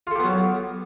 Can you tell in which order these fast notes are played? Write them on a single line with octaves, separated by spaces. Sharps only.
F4 A4 G4 B3 F#3